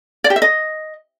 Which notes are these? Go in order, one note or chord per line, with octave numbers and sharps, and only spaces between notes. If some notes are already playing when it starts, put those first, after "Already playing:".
D5
G4
E5
D#5